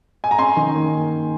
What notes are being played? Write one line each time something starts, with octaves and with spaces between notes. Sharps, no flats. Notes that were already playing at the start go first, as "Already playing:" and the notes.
G#5
A#5
C#4 G#5 C6
D#3
A#3